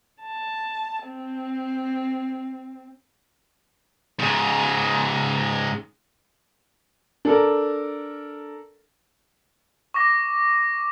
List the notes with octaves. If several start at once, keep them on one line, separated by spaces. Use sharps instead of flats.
A5
C4
G#2 C#3
D4 A4 A#4
C#6 D6 A#6